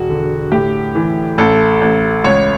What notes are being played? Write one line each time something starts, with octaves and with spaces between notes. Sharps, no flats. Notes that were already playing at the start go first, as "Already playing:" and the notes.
Already playing: E1 F#4
D3
A2 G4
E3
A1 A4
A1
C#2 C#5